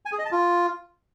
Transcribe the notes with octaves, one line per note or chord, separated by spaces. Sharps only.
G#5
G#4
D#5
A5
F4